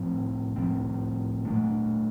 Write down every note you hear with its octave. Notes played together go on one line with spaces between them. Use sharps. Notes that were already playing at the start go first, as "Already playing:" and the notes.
Already playing: A2 F3 C4
A2 F3 C4
A#2 A3 D4